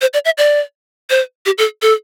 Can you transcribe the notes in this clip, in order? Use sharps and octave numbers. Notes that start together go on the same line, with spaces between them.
C5
D5
E5
D5
C5
G4
A4
A4